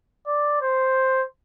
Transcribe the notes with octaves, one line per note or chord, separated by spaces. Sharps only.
D5
C5